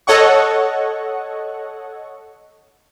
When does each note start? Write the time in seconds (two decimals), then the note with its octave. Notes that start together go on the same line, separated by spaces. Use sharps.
0.07 A4 C#5 D#5 F#5 C#6